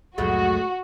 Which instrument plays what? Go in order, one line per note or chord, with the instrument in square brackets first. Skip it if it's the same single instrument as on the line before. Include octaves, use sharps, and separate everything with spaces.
[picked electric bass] C2 F2 F#3 [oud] A2 G#3 A3 [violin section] F#4